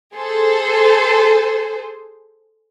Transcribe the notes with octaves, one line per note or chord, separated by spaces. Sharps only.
G#4 A4 C5